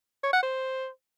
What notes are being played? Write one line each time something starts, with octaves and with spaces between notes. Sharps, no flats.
C#5
F#5
C5